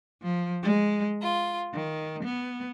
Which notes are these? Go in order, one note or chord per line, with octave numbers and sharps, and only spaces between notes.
F3
G#3
F4
D#3
B3